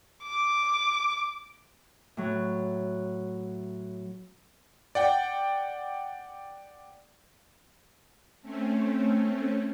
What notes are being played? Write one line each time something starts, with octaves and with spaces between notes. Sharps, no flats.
D6
A2 F#3
D5 F#5 G5
A3 C4 C#4